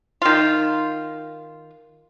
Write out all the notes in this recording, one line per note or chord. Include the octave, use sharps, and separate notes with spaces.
D#3 F4